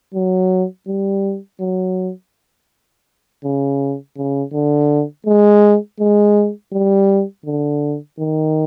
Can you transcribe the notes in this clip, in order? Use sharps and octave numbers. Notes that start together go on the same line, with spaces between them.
F#3
G3
F#3
C#3
C#3
D3
G#3
G#3
G3
D3
D#3